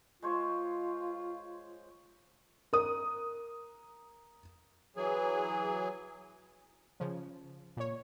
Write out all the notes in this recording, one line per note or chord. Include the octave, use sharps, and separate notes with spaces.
G#3 F4 C5 C#5
A#4 D#6
E3 F#3 G#4
C#3 F3
A#2 C#5